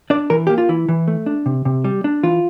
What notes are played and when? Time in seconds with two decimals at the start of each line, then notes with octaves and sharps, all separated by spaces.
0.10 D4 D5
0.30 E3 A#4
0.47 A#3 G4
0.58 F4
0.69 E3 E4
0.89 E3
1.08 A3
1.26 D4
1.46 C3
1.65 C3
1.84 G3
2.04 D4
2.23 E3 F4